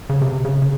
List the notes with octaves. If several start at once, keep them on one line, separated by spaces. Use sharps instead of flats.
C#3
C3
C#3
C#3